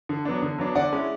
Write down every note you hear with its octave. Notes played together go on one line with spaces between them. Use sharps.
D3
F#3 B3 D4
D3
F#3 B3 D4
D3 D5 F#5
G#3 C#4 E4